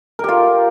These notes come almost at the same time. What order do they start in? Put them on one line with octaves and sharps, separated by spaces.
A#4 G4 F4